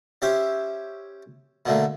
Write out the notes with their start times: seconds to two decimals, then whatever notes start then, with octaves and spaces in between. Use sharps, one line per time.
0.22 C#4 G4 C5 E5
1.65 B2 D3 A3 A#3